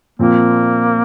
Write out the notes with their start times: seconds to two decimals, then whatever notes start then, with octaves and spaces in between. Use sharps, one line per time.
0.19 A#2 F3 A#3 C4